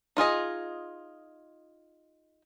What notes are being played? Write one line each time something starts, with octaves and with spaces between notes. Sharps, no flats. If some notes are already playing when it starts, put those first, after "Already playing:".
D#4 F4 G#4 D#5